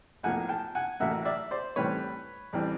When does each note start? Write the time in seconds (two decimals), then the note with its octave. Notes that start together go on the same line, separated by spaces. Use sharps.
0.23 B1 A2 F3 A#3 F#5 G#5
0.49 G5 A5
0.75 F#5 G#5
1.00 A1 A2 F#3 A#3 E5 F#5
1.25 D5 E5
1.51 C5 D5
1.76 A2 E3 G3 C4 B4 C#5
2.53 A1 E3 G3 C4